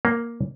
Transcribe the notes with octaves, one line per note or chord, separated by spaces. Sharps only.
A#3